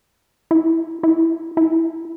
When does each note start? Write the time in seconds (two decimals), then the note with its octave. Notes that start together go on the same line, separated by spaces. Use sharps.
0.51 E4
1.03 E4
1.57 E4